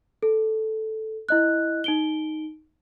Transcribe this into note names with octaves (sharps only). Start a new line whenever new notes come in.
A4
E4 D#5 F#6
D#4 D7 G7